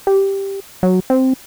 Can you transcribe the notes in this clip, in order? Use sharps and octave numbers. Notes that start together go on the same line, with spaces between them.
G4
F#3
C4